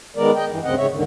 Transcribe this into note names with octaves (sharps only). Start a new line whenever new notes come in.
D#3 G#3 B3 A#4 D5
D#5 G5
G2 E3
D2 G2 C#3 C4 D#5 F#5
G#2 C#3 C#5 E5
D#2 G#2 D3 D#3